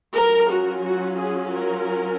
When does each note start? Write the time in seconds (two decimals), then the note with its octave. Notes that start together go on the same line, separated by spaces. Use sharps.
0.16 F#3 C#4 F4 A#4
0.50 F#4
0.84 F#4
1.18 G#4
1.51 A#4